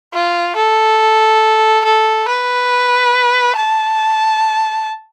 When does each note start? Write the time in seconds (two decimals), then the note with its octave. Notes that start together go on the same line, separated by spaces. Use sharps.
0.13 F4
0.56 A4
1.85 A4
2.28 B4
3.56 A5